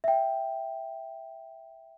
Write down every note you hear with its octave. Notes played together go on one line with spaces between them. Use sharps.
E5 G5